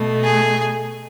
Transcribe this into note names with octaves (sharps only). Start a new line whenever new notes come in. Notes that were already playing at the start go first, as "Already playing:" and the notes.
Already playing: B2 A3
G#4